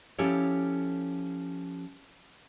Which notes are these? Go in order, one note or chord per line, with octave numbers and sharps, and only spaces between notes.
F3 C#4 E4 G4 A4 C#5